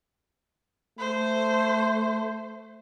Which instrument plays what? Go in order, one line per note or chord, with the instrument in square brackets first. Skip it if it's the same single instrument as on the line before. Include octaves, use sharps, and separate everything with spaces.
[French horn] A3 [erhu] C5